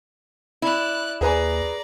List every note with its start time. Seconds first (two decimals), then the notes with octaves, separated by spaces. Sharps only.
0.62 E4 D5 F#6
1.21 D#2 G#4 B4 D5 G#5 A#5